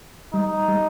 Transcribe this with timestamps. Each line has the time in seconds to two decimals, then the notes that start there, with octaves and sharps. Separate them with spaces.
0.33 G3 D#4
0.68 G3